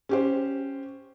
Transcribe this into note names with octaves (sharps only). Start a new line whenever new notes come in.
C#4 G4 C5